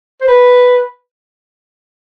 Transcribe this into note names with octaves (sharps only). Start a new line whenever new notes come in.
C5
B4